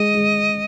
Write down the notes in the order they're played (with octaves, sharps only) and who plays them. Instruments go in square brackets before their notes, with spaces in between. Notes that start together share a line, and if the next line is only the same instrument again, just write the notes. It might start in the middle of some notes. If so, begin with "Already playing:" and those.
Already playing: [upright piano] G#3 [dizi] D#5
[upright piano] G#3